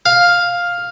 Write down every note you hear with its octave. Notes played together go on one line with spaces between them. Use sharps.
F5